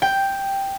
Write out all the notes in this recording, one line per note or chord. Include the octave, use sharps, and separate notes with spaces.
G5